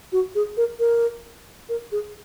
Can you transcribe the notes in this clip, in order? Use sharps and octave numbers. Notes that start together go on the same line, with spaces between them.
F#4
G#4
A#4
A#4
A#4
G#4